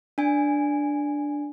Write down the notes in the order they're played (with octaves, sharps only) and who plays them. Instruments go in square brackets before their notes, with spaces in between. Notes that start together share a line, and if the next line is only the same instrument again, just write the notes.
[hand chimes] D4 G#5